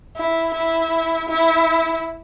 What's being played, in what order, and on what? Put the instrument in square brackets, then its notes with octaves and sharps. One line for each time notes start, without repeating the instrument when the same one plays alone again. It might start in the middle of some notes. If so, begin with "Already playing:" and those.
[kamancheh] E4
E4
E4